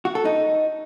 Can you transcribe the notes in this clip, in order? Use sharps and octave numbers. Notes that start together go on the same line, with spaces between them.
F#4
A4
D#4